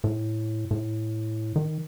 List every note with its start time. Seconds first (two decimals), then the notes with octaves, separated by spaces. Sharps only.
0.04 A2
0.71 A2
1.56 D#3